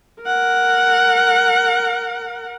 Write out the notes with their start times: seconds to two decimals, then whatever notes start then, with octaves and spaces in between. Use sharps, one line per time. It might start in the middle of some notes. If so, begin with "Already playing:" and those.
0.22 A#4 F#5